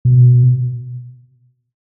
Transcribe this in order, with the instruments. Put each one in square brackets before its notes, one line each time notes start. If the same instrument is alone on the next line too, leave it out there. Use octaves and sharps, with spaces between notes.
[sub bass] B2